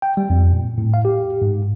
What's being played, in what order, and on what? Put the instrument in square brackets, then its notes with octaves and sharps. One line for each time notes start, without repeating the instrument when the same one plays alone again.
[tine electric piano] G5
G3
F2
A#2
A2
F5
G4
G#2